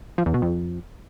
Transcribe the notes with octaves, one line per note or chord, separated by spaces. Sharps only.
F3
E2
B2
F2